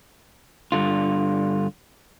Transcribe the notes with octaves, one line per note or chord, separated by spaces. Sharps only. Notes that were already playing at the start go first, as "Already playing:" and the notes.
G2 D3 F4